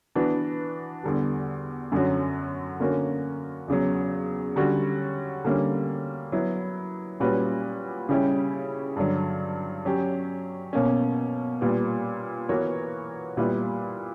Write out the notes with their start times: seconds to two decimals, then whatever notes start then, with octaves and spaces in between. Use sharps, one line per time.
0.15 E3 B3 D4 F#4
1.04 E2 D3 G3
1.92 F#2 D3 F#3 C#4 F#4
2.80 D3 A#3 C#4 F#4 A#4
3.68 E2 C#3 F#3
4.56 D3 G3 C#4 F#4 C#5
5.45 D3 G3 A#3 C#4
6.32 F#3 B3 E4
7.20 A#2 G3 C#4 F#4 B4
8.09 C#3 G3 C#4 E4 G4
8.96 G2 D3 F#3
9.85 F#3 C#4 G4
10.73 B2 A#3 C#4
11.61 A#2 G3 B3
12.49 E3 B3 F#4 A#4 C#5
13.37 A#2 G3 B3 E4 B4